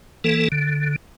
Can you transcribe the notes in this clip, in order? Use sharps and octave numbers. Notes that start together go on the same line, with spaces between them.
E3 A#3 A4
D3